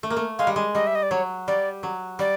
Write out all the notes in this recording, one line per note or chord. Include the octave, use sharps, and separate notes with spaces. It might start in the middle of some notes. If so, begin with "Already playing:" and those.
A3
A#3
A3
G#3 F5
G3
G#3
G3 D#5
E5
D#5
D5
F#3 C#5
G3 D5
F#3
G3 D5